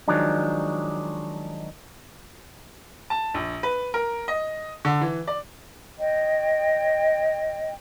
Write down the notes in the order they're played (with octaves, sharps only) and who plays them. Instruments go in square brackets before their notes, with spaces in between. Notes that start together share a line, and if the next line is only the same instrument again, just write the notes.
[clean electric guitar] D#3 F3 F#3 G#3 D4
[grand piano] A5
A#1
B4
A#4
D#5
D3
E3
D5
[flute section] C#5 D#5 G5